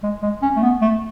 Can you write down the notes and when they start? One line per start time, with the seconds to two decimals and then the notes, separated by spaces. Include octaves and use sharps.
0.03 G#3
0.22 G#3
0.42 C#4
0.56 A3
0.62 B3
0.82 A3